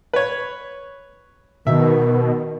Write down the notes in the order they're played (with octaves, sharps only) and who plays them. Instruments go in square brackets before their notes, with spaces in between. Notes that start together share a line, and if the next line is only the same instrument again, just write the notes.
[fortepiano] B4 C#5
[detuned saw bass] B2 [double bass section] D#3 [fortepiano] E5